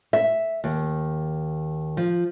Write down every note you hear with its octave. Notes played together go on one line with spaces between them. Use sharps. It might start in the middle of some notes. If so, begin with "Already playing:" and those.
E5
D#2
F3